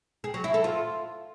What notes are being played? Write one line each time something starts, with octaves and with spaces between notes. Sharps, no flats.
G#4
F#3
E4
A4
F4